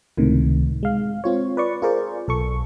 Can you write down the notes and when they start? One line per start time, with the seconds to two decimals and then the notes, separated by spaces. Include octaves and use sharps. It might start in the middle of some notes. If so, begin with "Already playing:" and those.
0.17 C#2 A2 C3 D#3
0.83 G#3 F5
1.24 C4 F4 C#5
1.57 B4 D5 C#6
1.82 F4 G#4 A#4 C5 D5
2.28 B1 A4 C#6